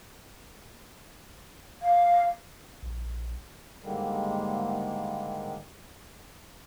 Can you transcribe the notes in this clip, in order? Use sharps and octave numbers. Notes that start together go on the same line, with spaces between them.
F5
A#1
G#2 D3 D#3 G3 G#3 A#3